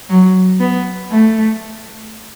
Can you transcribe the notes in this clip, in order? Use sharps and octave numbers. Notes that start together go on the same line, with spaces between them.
F#3
B3
A3